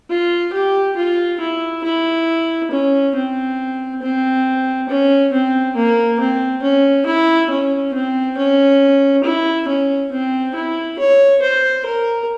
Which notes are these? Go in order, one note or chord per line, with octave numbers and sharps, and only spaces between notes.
F4
G4
F4
E4
E4
C#4
C4
C4
C#4
C4
A#3
C4
C#4
E4
C#4
C4
C#4
E4
C#4
C4
E4
C#5
C5
A#4